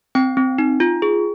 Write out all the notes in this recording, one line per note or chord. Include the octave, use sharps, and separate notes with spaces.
C4 G5
C4
D#4
F4
G#4